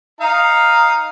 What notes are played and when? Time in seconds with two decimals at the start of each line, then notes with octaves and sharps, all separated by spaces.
0.21 D#4 F5 A#5